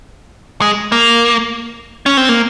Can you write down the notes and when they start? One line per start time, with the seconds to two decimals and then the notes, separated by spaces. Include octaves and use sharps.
0.61 G#3
0.92 A#3
2.06 C#4
2.17 C4
2.29 A#3